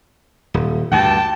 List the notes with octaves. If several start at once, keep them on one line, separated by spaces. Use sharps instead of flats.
D#1
D2 G2 G5 A5